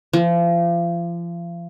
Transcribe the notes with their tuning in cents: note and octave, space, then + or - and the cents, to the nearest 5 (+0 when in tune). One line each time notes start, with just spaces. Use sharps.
F3 -35